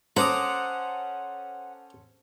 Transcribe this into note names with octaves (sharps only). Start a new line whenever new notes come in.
C#4 A4 C5 F#5 A#5 D6 D#6